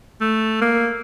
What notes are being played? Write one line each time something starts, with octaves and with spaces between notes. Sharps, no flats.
A3
A#3